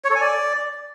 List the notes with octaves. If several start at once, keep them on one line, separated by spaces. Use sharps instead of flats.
C#5
A4
G#5
D5